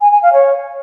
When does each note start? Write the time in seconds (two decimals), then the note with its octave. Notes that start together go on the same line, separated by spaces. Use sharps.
0.01 G#5
0.12 G#5
0.23 F5
0.33 C#5